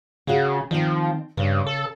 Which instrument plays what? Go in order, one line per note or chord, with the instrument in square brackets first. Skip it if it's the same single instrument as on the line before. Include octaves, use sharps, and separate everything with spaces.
[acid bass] C#3 [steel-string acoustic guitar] F#4 G#4 F5
[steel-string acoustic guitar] D#3 C4 [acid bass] F3
[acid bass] G2 [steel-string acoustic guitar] C#3
[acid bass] A4